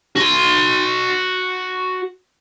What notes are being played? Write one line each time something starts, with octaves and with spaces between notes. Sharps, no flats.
F#4 C6